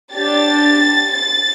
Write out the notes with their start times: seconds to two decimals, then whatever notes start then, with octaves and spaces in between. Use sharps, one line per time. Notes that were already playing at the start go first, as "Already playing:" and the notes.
0.15 D4 G4 A6
1.13 A6